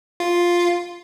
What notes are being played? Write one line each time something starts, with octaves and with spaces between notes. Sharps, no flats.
F4